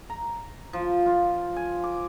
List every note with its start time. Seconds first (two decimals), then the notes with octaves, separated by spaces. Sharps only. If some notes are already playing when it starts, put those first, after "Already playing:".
0.10 A#5
0.73 F3
1.06 F4
1.56 G#5
1.84 D6